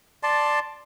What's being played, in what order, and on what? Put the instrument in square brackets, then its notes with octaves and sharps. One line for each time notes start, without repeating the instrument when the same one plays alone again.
[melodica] D5 A5 C6